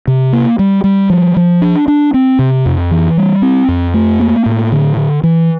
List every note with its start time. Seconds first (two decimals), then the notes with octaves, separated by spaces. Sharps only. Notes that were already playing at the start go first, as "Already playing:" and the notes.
0.08 C3
0.33 A#3
0.59 G3
0.84 G3
1.10 F3
1.37 F3
1.62 D4
1.88 D4
2.14 C4
2.39 C3
2.66 F2
2.91 E3
3.17 G3
3.42 C4
3.69 F2
3.94 A3
4.20 A#3
4.46 A2
4.72 D3
4.97 D3
5.23 E3